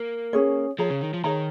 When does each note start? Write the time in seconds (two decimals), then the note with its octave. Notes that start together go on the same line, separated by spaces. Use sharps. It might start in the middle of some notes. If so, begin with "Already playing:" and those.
Already playing: A#3
0.33 C#4 G#4 C#5
0.79 F3 G#4 C#5 A#5
0.90 C#3
1.01 D#3
1.13 F3
1.24 D#3 G#4 C#5 A#5